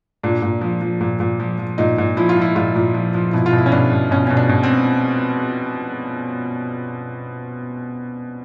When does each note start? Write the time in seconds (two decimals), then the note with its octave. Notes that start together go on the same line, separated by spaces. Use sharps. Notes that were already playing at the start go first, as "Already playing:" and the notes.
0.23 A#2 D4
0.42 A#2
0.61 F3
0.82 F3
1.01 A#2
1.20 A#2
1.40 F3
1.59 F3
1.78 A#2 D#4
1.98 A#2
2.17 F3 E4
2.29 F4
2.37 F3 E4
2.56 A#2 F4
2.75 A#2
2.94 F3
3.14 F3
3.33 B2 E4
3.46 F4
3.53 B2
3.58 E4
3.66 C#4
3.72 B2 D4
3.92 B2
4.11 B2 C#4
4.27 B2 C#4
4.37 D4
4.49 B2
4.63 C4